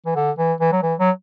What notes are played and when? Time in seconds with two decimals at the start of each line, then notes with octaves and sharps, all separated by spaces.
0.06 E3
0.15 D3
0.38 E3
0.60 E3
0.72 F#3
0.83 E3
0.99 F#3